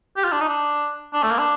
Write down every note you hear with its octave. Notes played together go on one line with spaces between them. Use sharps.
G4
F4
D4
D#4
D4
D4
A3
A#3
D4